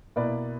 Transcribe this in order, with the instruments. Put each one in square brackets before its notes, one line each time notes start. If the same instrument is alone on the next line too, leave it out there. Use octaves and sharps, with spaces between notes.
[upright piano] B2 A#3 E4 B4 D5